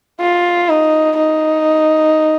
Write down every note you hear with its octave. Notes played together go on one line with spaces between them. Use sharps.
F4
D#4
D#4